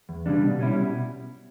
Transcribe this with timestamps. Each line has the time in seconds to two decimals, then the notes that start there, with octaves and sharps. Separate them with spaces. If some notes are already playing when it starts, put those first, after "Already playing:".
0.09 E2
0.26 C#3 G3 D4
0.43 B2
0.59 G3 C#4 E4
0.75 B2